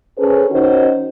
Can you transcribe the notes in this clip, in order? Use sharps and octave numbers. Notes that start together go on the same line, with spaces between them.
C#4 G#4 A4 B4 C5
D#3 C#4 D#4 F#4 C5